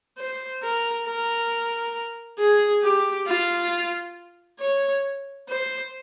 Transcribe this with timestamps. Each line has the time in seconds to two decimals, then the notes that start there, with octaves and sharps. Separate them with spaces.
0.18 C5
0.63 A#4
1.07 A#4
2.40 G#4
2.84 G4
3.28 F4
4.60 C#5
5.49 C5